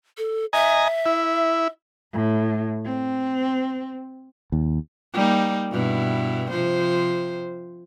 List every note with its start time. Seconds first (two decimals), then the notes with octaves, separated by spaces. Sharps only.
0.18 A4
0.53 D#5 E5 G#5 A#5
1.06 E4
2.13 A2
2.85 C4
4.52 D#2
5.13 G3 A#3 D#4
5.71 G2 B2 E4
6.50 C3 F3 C5